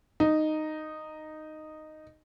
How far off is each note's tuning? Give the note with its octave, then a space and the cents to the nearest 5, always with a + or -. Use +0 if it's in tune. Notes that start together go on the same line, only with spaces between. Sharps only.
D#4 -5